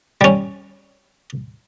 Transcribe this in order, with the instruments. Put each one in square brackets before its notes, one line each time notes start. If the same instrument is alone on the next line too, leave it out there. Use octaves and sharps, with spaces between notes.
[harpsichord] G3 C#4